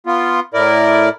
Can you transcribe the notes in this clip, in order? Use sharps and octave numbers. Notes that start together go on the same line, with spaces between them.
B3 F4
A2 E4 A#4 D5